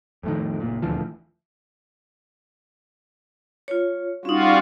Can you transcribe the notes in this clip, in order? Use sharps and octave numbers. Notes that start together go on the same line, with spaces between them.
F2 A2 D#3
F#1 A#2
D#1 D2 E3 F3
F4 C#5
G3 C#4 D#4 F4 F#4